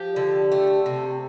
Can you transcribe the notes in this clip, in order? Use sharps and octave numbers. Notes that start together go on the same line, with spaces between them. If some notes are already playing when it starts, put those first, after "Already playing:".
Already playing: F3 G4
D3
A3
C3